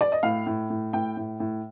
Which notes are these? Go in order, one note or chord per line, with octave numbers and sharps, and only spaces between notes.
D5
D#5
A2 F5
A2
A2
A2 G5
A2
A2